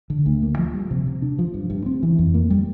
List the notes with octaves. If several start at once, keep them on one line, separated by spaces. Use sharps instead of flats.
D3
D2
A#3
F3
G3
C3
C3
D4
F3
G2
G2
C4
E3
F2
A#3
G3